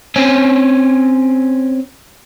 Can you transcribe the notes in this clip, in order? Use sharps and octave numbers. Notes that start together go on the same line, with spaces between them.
C4 C#4